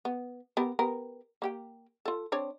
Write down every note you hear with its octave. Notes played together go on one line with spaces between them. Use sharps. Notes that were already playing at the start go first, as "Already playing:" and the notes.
B3
B3 G4 A#4
B3 G4 A#4
A#3 G4 G5
F4 A4
C4 D4 C#5